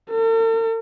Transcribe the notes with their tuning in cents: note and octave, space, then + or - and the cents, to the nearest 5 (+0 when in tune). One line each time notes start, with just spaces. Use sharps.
A4 +45